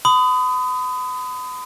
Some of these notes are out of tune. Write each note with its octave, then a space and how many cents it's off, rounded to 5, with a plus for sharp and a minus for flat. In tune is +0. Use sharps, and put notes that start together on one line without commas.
B5 +40 D#6 +0